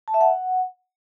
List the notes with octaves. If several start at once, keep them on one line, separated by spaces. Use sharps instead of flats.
A5
E5
F#5